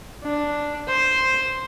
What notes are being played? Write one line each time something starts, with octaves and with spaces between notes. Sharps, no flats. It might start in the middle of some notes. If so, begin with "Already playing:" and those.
D4
C5